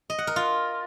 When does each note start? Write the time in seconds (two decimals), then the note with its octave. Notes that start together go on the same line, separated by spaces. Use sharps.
0.10 D#5
0.18 F#5
0.27 A#4
0.36 F4